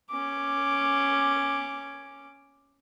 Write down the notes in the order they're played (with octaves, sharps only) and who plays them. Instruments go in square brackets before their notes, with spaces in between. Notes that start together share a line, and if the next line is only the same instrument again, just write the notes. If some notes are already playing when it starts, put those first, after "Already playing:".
[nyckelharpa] C#4 D6